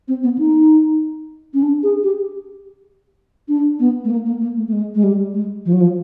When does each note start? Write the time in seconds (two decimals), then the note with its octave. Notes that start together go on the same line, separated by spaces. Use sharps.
0.08 C4
0.23 B3
0.38 D#4
1.54 C#4
1.63 D4
1.83 G#4
2.03 G4
3.48 D4
3.80 B3
4.04 A3
4.10 A#3
4.26 A#3
4.41 A#3
4.57 A3
4.68 A3
4.73 G#3
4.95 G#3
5.04 G3
5.34 G#3
5.66 F3
5.73 F#3
5.81 F3